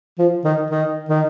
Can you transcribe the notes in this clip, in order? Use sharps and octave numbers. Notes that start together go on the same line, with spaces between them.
F3
D#3
D#3
D#3